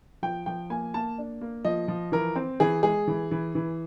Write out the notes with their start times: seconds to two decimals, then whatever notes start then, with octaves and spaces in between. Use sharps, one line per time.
0.23 F3 G5
0.46 F3 G5
0.70 A#3 G#5
0.94 A#3 A5
1.18 D4
1.41 A#3
1.65 F3 D#5
1.88 F3
2.12 E3 A#4
2.36 C4
2.60 E3 G#4
2.83 G#3 G#4
3.08 E3
3.31 E3
3.55 E3